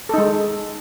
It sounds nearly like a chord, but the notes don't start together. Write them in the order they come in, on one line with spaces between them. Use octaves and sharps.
A4 D#4 G#3